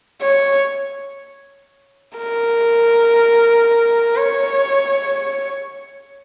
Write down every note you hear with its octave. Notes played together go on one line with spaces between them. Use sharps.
C#5
A#4
C#5